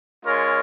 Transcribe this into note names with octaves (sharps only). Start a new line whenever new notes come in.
G#3 C#4 F4 A#4 C#5